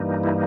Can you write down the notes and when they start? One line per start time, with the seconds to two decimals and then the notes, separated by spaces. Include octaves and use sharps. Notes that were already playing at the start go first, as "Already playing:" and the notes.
Already playing: G2 E3 G3 A#3 D#4
0.24 E4